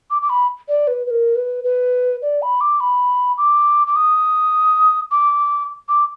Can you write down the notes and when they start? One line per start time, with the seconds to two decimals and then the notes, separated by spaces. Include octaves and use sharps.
0.11 D6
0.22 D6
0.30 B5
0.68 D5
0.88 B4
1.07 B4
1.11 A#4
1.35 B4
1.64 B4
2.22 D5
2.42 B5
2.61 D6
2.80 B5
3.38 D6
3.87 D6
3.96 D#6
5.11 D6
5.89 D6